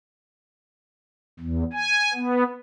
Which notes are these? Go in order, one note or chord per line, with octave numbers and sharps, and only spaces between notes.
E2
G#5
B3